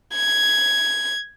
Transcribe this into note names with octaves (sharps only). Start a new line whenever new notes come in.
G#6